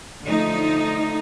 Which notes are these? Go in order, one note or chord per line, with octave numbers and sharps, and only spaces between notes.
D3 F3 A3 D#4